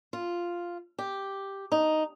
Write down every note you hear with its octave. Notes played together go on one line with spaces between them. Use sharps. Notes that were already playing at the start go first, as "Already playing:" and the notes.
F4
G4
D#4